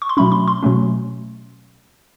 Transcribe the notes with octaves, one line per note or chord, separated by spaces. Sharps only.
C#6
C6
B2 F#3 A3 C#4 B5
C6
C6
B2 F#3 A3 C#4